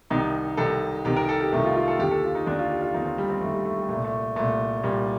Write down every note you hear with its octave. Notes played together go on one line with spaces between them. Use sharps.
C2 C3 D#3 D#4
C2 C3 D#3 A4
C2 C3 D#3 G4
A#4
A4
G4
C2 C3 D#3 A3
F4
F4
A4
D#2 D3 G4
A4
F4
D#4
D#2 D3 D4
F4
G4
F4
D#2 D3 D#4
C4
G3
C4
D#2 D3 A3
G3
A3
G3
C2 A#2 A3
A3
C2 A#2 A3
C2 A#2 G3